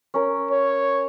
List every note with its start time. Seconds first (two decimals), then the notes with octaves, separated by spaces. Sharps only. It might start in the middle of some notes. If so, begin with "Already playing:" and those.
0.14 C#4 A#4
0.51 C#5